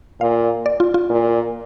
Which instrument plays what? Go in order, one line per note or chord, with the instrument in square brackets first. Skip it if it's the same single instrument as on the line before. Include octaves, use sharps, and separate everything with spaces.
[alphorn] A#2 [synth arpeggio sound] F5
[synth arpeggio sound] D5
F4
F4
[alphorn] A#2